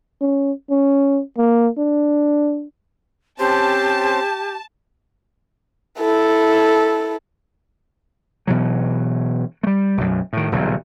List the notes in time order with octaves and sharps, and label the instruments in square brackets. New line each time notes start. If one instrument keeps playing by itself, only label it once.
[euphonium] C#4
C#4
A#3
D4
[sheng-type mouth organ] C4 C#4 C5 [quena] G4 [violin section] A5
[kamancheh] E4 A4
[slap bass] B2 E3 F#3
G3 A3
B1 F#2
A2 D#3
D#1 B1 C#3